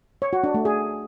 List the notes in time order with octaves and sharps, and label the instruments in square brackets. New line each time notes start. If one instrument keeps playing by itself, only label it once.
[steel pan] C#5
F#4
D4
A3
G#4